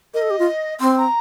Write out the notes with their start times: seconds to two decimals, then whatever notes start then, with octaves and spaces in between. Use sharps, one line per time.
0.14 A#4 D#5
0.22 A4
0.30 G4
0.39 F4
0.80 C4 C6
0.97 A#5